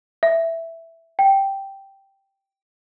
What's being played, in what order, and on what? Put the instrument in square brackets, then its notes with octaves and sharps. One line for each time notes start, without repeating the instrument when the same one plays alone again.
[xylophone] E5
G5